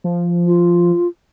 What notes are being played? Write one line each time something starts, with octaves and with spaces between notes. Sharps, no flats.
F3
F4